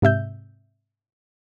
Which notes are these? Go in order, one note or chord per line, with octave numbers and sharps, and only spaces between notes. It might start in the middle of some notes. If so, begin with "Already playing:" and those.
G#2 C3 E5 G6